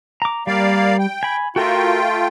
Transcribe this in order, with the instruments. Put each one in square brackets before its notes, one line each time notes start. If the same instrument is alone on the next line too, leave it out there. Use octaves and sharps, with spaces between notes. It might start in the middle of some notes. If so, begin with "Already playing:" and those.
[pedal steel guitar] A#5 D6
[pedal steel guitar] G3 [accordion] A#3 D5 F5
[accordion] G5
[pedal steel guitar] G#5 B5
[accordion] A3 F4 G5 [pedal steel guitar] F#4 A4 A#4